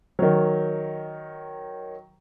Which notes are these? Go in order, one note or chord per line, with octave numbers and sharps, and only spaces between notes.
D#3 F#3